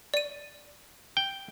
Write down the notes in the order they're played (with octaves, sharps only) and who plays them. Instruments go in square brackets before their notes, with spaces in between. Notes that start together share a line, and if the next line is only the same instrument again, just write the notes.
[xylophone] D5 D#7
[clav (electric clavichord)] G5